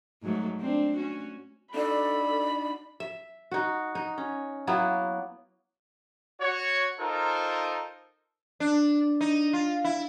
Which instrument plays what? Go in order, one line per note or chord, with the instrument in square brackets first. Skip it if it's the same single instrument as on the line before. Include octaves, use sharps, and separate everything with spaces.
[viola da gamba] G#2 F#3 A3
C4 D4
C#4 F#4
[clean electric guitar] D4 D#4 F#4 [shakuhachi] A4 [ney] D5 [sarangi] B5
[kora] E5
D#4 F#4
D#4
C#4
F#3 A#3 B3 E4
[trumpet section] F#4 C#5
D#4 F4 A4 A#4 C5
[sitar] D4
D#4
F4
E4